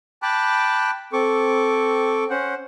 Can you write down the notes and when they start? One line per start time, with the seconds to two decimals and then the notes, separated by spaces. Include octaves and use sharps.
0.22 G5 A5 B5 D6 F#6
1.13 C4 A4 C#6 D6
2.30 C#4 C5 F#5